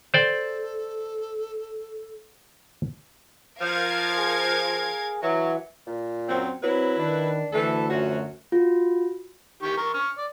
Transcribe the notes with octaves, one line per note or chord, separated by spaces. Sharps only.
A4 C5 D5 G5
F3 A#4 F5 G#6
G#4
E3 F#3
A#2
F#2 F#3 C4
F#3 C4 E4 B4
D#3 D4
D2 E3 A4
F#2 F3 C#4 F#4
F4 F#4
D#3 G4 C#6
A#4 C#6
C#6 F6
D5